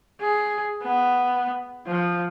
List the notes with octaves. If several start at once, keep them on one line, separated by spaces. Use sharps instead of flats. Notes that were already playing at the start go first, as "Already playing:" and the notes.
G#4
B3
F3